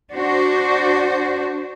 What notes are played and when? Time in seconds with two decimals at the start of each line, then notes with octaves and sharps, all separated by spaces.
0.13 D4 F#4 C5